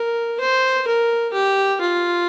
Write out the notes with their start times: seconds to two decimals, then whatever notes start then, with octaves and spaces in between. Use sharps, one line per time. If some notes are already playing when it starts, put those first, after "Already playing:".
Already playing: A#4
0.40 C5
0.87 A#4
1.33 G4
1.81 F4